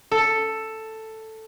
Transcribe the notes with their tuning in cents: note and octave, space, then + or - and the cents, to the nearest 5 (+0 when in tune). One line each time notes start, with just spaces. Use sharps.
A4 +5